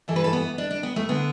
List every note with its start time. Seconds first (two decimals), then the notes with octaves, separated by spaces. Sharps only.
0.08 G2 E3 A4
0.16 B4
0.24 A4
0.33 B3
0.58 D4
0.71 D4
0.83 B3
0.96 A3
1.09 D3 B3